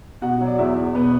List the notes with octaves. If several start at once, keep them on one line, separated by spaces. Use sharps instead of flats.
B2 F#4 F#5
F#3
D5
E2 E4 E5
E2
B2 B3 B4